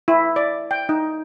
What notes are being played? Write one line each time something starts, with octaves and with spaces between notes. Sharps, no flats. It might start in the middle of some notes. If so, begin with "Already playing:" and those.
E4
D5
G5
D#4